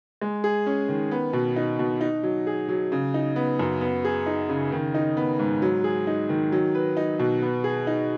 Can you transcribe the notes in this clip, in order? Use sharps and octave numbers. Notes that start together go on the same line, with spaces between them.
G#3
G#4
C#4
D#3
B3
B2
D#4
B2
D#4
F#3
G#4
F#3
C#3
D#4
B3
F#2
B3
G#4
D#4
C#3
D#3
D#4
B3
G#2
F#3
G#4
D#4
D#3
F#3
B4
D#4
B2
B3
G#4
D#4